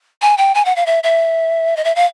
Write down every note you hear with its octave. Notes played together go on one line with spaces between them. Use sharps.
G#5
G5
G#5
F#5
F5
E5
E5
D#5
E5
F5